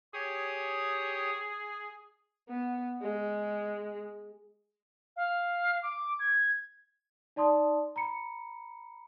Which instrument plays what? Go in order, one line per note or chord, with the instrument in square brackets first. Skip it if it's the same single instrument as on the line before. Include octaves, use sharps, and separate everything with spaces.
[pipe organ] G4 C#5 D#6 [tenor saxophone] G#4
[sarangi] B3
G#3
[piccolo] F5
D6
G#6
[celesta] D#4 D5 A5 C6 D#6
A#5 B5 C#7